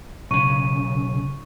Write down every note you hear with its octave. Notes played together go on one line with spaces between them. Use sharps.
B1 C#3 C#6 D#7